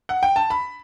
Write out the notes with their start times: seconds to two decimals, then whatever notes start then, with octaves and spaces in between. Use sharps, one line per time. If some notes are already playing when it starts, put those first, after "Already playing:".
0.09 F#5
0.23 G5
0.36 A5
0.50 B5